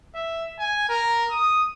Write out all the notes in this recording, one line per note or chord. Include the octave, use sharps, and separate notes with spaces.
E5
G#5
A#4
D#6